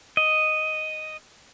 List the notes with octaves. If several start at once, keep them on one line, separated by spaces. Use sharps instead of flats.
D#5